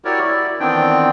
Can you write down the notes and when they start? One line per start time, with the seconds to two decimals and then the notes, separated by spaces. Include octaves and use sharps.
0.05 E4 F#4 G4 A#4 C#5 D5
0.25 E4 D5
0.60 D#3 E3 B3 C4 D4 G5